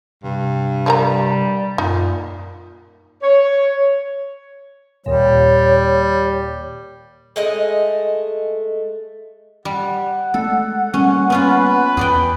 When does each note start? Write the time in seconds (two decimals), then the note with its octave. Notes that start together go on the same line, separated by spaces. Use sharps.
0.24 G2 C3
0.86 F3 G3 A#4 A#5
1.78 F#2 A#2 D#4
3.23 C#5
5.06 D#2 A#2 G3 C#5
7.36 G#3 A3 D#5
9.65 G3 F#5
10.34 G#3 A3 A4
10.94 G3 A#3 C#4
11.30 B3 C#4 F4 B4
11.97 E2 G#4 D5 G5